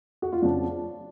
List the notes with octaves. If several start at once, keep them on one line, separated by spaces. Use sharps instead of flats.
F#4
F4
F2 C#3 F3 D4